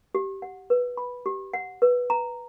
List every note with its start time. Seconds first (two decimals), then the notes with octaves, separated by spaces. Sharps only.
0.15 G4
0.42 F#5
0.70 B4
0.97 B5
1.26 G4
1.54 F#5
1.82 B4
2.10 A#5